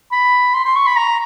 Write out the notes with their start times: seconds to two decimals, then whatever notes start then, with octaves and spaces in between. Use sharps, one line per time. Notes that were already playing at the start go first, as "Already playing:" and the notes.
0.12 B5
0.54 C6
0.65 C6
0.76 C#6
0.86 B5
0.97 A#5